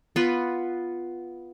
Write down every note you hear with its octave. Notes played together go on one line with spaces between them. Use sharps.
B3 F4 B4